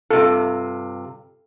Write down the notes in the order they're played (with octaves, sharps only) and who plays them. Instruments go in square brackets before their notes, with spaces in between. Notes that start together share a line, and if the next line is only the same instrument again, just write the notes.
[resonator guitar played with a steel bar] G2 C3 F4 [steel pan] A4